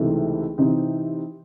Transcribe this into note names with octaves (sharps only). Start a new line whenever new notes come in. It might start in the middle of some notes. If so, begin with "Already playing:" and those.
Already playing: C#2 C3 E3 A3 D#4
C3 E3 C4 D#4